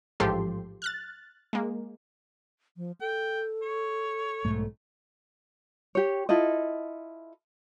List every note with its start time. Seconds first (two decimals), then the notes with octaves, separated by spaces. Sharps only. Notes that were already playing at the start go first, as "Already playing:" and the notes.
0.20 A1 G#2 F3 G4 A4 C6
0.82 F6 F#6 A6
1.53 G#3 A#3
2.77 F3
3.01 A4 G5
3.62 C#5
4.45 B1 G#2 A3
5.95 G4 C#5
6.29 E4 F4 A4 D#5